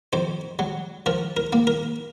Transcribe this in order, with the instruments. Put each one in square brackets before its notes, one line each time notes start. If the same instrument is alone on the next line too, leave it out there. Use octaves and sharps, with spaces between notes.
[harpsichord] F2 C5
F#3
F3 A#4
A#4
A#3
A#4